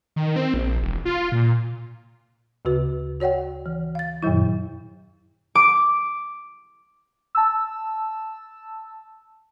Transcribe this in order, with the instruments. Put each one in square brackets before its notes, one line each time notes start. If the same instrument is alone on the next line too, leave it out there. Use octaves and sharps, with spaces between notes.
[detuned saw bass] D#3
C4
A#1
E1
F4
A#2
[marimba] D2 C#3 F#4 B4
F#4 C#5 D5 F#5 G5
E3
F5 A6
F#2 A#2 D#3 F#3 E4
[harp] D6
[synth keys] A5 E6